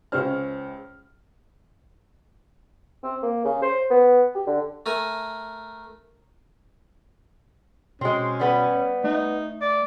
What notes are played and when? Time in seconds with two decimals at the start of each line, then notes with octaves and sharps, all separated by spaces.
0.12 C#2 G#3 C#4 C5 F6
3.03 C4
3.23 A#3
3.44 C#3
3.62 C5
3.90 B3
4.35 G4
4.47 D3
4.86 A3 A#4 G#5
8.01 B2 G#3 C4 C#4
8.40 G3 B3 B4
9.04 A3 D#4
9.61 D5